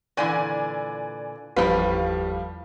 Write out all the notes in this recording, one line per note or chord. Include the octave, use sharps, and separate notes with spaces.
A#2 D3 E3 D5 G#5
G1 E2 A2 F3 G3 B4 F5